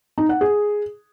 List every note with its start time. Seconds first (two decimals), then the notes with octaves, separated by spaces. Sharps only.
0.18 D#4
0.29 F#5
0.41 G#4